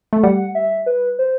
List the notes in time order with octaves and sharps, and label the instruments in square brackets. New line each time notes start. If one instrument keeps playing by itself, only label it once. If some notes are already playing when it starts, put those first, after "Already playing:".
[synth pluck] A3
[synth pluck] G3 [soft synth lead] F#5
[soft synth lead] E5
B4
C5